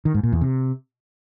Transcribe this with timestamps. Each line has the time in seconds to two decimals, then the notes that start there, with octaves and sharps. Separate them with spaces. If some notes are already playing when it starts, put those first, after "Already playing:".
0.05 D#3
0.14 G#2
0.23 A#2
0.32 E2
0.41 C3